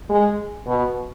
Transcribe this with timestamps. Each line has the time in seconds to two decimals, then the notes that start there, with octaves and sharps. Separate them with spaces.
0.10 G#3
0.67 B2